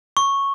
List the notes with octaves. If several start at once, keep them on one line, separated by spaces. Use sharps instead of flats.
C#6